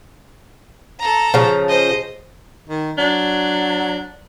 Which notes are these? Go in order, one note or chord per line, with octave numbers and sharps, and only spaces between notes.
A4 A#5
C#3 F3
C5 D#5
D#3
F#3 D4